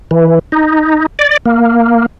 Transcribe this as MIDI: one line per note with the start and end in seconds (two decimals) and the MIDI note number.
0.11 0.39 52
0.52 1.06 63
1.19 1.37 74
1.45 2.06 58